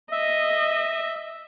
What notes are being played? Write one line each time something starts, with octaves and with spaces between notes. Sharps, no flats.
D#5 E5